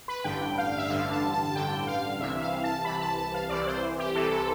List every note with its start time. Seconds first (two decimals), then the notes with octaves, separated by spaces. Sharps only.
0.08 B4
0.24 A1 G2 D3 G5
0.58 F5
0.78 E5
0.89 A1 G2 D3 F5
1.11 A5
1.34 A5
1.55 A1 G2 D3 G5
1.87 F5
2.20 C2 C3 E3 E5
2.41 F5
2.64 A5
2.84 C2 C3 E3 B5
3.01 A5
3.17 A5
3.34 F5
3.49 C2 C3 E3 D5
3.67 C5
3.99 G4
4.15 C2 C3 E3 A4
4.31 A4